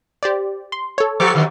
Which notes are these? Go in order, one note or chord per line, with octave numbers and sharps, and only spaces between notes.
G4 C5 D5
C6
A4 C#5
F3 G4 A4 C5 D6
D3 D#3 F#3